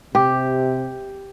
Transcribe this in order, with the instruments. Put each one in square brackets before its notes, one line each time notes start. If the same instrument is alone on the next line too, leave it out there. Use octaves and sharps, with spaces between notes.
[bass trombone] C3 [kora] G4